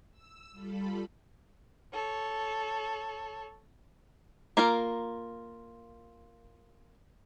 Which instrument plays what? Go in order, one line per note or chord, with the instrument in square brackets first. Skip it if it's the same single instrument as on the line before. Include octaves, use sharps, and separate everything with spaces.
[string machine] E6
G3 F4 A4 B5
[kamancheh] A4 C#5
[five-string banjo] A#3 F4 A#4